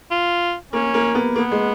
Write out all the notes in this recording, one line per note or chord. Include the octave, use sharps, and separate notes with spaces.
F4
A#3 C#4
A#3
B3
A#3 B3
G#3